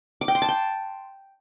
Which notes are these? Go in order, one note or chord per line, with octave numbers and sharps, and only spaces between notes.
D6
G5
C6
A5
G5